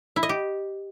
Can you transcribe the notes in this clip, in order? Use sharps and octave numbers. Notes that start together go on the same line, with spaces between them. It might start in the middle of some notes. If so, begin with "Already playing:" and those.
E4
D#5
G4